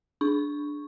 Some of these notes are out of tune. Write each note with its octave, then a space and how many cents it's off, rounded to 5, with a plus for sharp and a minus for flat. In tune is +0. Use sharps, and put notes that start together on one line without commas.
D4 +0 C#6 +0